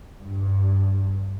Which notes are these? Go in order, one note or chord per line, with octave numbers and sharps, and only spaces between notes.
G2